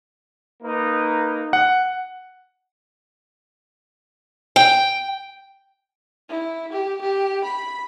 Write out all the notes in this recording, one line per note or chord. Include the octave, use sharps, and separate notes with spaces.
A#3 D#4 B4
F#5
G5
E4
G4
G4
B5